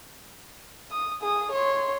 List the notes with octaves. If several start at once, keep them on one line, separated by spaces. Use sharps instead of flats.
D#6
G#4 D#6
C#5 C6